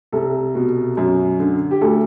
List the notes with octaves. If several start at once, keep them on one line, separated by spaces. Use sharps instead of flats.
C2 A4
B2
F#2
D3
G4
D2 A4